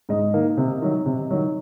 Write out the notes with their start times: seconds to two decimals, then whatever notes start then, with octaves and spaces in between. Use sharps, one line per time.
0.09 G#2 D#5
0.34 D#3 A#3 D#4
0.57 C3
0.82 D#3 F#3
1.06 C3
1.31 D#3 F#3